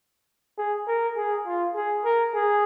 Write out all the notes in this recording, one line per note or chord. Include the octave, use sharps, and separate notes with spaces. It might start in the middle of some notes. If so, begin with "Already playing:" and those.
G#4
A#4
G#4
F4
G#4
A#4
G#4